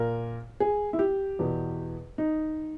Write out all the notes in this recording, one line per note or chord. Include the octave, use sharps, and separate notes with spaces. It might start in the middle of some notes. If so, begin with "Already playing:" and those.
Already playing: A#2 A#4
G#4
E4
G4
E2 B2
D#4